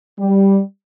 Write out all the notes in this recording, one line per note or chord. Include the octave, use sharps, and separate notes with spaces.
G3